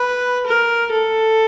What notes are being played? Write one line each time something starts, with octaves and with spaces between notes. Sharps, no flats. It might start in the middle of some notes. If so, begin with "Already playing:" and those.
Already playing: B4
A#4
A4